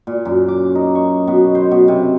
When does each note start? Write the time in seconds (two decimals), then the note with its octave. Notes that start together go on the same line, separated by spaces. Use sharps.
0.07 A#2
0.25 F#2
0.48 D6
0.75 D#4
0.95 C#6
1.27 B2
1.55 C5
1.71 B2
1.88 C3